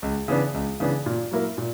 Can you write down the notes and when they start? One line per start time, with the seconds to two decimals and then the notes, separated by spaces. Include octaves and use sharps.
0.02 C#2
0.28 C#3 E3 B3 D4
0.54 C#2
0.80 C#3 E3 B3 D4
1.06 A#2
1.31 F#3 A#3 E4 A#4
1.58 A#2